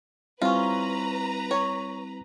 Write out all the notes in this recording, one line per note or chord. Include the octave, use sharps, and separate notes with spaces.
G3 C4 C#4 E4 F4 B4 A#5
C#5